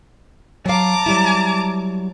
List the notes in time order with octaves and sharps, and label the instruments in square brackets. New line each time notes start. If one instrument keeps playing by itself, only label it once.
[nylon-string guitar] F#3 F5 [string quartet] A5 A#5 D6
[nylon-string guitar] F#3 G3 E4